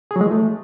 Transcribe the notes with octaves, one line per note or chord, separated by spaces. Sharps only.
G#4
F#3
G#3
E3
A3